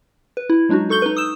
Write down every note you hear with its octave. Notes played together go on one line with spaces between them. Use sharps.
B4
E4
F#3 G#3 D4 D#4 F#4
D#4 A4 C#6 G6 G7
D#4 B4
D#6 E6 E7